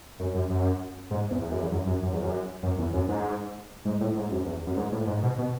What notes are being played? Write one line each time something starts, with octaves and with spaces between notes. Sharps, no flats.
F#2
F#2
F#2
G#2
E2
E2
F#2
E2
F#2
F#2
F#2
E2
F#2
F#2
E2
F#2
G#2
G#2
A2
G#2
F#2
E2
F#2
G#2
A2
G#2
B2
B2